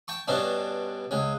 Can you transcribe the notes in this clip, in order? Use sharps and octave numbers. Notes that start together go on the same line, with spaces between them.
G5 A5 C#6
G2 B2 C#4 D4
C#2 C#4